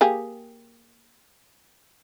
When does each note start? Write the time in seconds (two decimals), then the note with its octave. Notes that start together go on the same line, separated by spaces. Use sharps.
0.01 A#3 G4 G#4